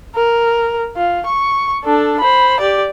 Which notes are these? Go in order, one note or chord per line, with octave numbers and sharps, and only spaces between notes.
A#4
F4
C#6
D4 A4
C5 B5
G4 D5